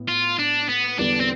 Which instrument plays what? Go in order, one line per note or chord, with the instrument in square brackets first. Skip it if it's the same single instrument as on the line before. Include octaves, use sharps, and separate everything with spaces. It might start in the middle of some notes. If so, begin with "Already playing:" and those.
Already playing: [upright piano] A2 B3
[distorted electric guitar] F4
D4
B3
[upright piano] E2 D3 G3 B3 [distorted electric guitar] D4
[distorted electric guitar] C4